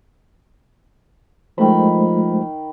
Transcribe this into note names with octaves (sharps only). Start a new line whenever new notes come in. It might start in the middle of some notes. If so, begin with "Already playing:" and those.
D#3 F3 G#3 A3 C5 B5